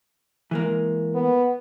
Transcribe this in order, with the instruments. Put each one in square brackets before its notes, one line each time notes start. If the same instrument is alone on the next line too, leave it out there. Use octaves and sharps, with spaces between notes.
[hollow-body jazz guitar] E3 G#3 A#3
[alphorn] B3